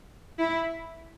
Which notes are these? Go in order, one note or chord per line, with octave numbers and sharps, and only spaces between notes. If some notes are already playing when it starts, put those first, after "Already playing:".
E4